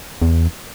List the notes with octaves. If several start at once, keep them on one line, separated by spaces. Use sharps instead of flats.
E2